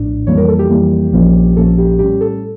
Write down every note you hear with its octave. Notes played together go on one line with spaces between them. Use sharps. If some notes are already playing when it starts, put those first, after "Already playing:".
Already playing: A#1 A2 D4
F2 E3 G3 A#3 C#5
A#4
A4
G4
F2 E3 G3 A#3
A#1 A#2 F3 A#3 C#4
A#1 A#2 F3 A#3 C#4 A4
G4
A2 G3 C#4 G4
A4